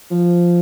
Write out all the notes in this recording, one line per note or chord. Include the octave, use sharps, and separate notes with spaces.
F3